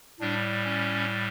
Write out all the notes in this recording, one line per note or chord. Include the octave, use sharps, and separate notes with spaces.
A2 G3 D4
C#4